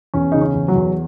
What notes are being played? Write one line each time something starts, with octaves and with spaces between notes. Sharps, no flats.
E2 C#4
C#3 D#4
C#4
E2
F#3
E2